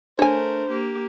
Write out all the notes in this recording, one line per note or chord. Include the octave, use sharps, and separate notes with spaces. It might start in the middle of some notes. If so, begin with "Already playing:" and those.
A3 D4 A#4 C5 C#5 G#5
A#3 G4